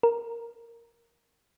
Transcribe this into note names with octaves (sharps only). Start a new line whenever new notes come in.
A#4